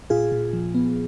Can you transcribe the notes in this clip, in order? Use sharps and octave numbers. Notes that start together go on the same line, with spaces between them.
A#2 F4 G#4
A#2
F3
B3